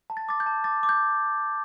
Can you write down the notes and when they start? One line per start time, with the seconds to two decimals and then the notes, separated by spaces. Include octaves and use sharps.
0.10 A5
0.17 A6
0.29 D6 A6
0.40 G6
0.46 A5
0.64 D6 A6
0.83 D6
0.89 G6